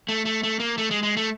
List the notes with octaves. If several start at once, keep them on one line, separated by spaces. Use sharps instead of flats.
A3
A3
A3
A#3
A3
G#3
G#3
A3